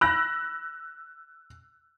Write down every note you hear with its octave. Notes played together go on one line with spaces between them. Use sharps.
B5 E6 F#6 A#6